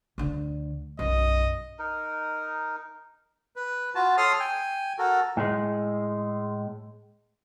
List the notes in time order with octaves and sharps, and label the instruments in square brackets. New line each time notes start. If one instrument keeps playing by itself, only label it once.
[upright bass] D2 D3
[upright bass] B1 F#2 [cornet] D#5
[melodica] D#4 A#4
[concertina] B4
F4 F#4 A5
A4 C#5 C6 D#6 F6
G5 G#5
F#4 A4 A#4
[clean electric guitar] A2 G#3